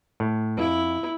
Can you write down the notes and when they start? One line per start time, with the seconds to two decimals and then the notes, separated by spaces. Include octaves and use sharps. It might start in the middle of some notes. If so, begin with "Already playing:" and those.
0.20 A2
0.58 F2 E4